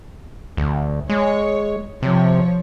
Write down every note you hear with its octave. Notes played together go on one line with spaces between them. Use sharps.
D2
G#3 C#5
C3 F3 C#5